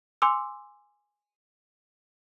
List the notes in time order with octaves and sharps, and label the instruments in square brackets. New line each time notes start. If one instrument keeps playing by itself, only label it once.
[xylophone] G#5 C6 D6 E6